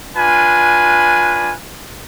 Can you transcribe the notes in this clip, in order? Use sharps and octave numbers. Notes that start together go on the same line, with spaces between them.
D4 F4 B4 G#5